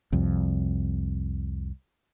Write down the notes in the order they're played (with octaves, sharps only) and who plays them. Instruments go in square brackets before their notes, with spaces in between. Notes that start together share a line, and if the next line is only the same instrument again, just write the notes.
[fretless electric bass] C2 F2